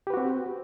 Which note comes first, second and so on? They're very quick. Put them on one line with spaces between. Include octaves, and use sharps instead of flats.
G4 B4 F#4 C4